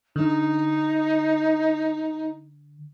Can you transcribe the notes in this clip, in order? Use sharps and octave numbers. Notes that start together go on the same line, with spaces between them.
D3 D#4